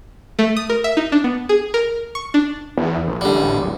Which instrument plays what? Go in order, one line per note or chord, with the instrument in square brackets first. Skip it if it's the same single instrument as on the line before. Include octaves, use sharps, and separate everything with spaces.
[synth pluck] A3
D#6
A#4
E5
D#4
D4
B3
G#4
A#4
C#6
D4
[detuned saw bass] E2
A#1
[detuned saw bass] A1 [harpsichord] D3 G3
[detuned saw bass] D1